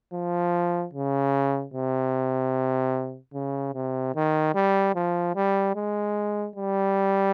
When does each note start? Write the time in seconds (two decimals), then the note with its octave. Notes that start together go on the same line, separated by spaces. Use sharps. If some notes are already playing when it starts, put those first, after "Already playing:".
0.13 F3
0.93 C#3
1.74 C3
3.34 C#3
3.74 C3
4.15 D#3
4.55 G3
4.95 F3
5.35 G3
5.75 G#3
6.56 G3